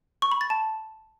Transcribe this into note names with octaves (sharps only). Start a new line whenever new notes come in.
C#6
B5
A6
A5